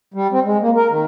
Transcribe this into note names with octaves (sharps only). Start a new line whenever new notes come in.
G3
C4
G#3
A#3
A#4
D#3